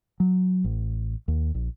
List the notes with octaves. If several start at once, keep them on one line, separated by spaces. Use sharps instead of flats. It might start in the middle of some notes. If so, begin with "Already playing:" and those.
F#3
A1
D#2
A#1